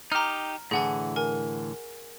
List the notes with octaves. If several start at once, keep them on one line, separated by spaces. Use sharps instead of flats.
D#4 G4 A#5 F6
A2 D3 E3 G#4 F#5 G#5
A#4 G#5